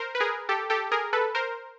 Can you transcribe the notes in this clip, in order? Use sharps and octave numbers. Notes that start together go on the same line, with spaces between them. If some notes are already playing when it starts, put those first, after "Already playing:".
Already playing: A#4 C5
B4
G#4 A#4
G4 A4
G4 A4
G#4 A#4
A4 B4
A#4 C5